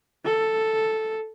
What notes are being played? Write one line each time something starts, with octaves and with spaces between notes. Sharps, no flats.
A4